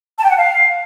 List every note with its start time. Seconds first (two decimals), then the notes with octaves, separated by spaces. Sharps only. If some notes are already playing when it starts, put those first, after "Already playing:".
0.17 A5
0.24 G5
0.31 F#5
0.37 F5